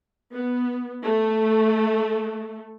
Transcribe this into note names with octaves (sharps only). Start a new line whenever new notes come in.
B3
A3